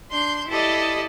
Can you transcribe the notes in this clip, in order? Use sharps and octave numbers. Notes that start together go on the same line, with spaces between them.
D4 C6 G6
E4 G4 A4 D5 D#5